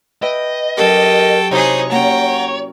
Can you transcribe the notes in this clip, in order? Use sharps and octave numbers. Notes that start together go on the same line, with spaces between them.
B4 D#5 E5 G5
F#3 C#4 G4 A4 A#4 G5
C3 D#4 E4 F#4 G#4 C5 C#5
A#3 C#4 F#5 G5 A#5